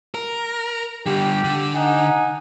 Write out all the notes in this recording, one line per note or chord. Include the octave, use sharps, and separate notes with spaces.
A#4
D3 G3 G4
D3
D#4 F#5 G#5